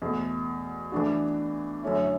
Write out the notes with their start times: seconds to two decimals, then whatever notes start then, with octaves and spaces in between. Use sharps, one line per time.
0.02 E2 B2 A3
0.92 E3 A3 D4 F#4
1.83 F#2 D3 A3 C#4 E4